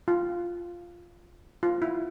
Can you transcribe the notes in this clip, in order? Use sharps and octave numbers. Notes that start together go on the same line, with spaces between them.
F4
F4
E4